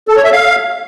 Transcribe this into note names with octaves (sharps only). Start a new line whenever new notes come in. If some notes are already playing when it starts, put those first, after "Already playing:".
A4
C#5
E5
F5